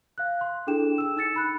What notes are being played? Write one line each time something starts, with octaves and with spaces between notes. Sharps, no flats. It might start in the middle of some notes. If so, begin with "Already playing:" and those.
F5 F#6
C6
D4 E4 G#4 A4 G5 E7
E6 E7
D#4 E6 A6 C#7
B5 F#6